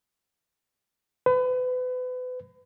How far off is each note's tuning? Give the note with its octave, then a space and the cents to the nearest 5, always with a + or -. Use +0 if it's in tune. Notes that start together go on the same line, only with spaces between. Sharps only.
B4 +35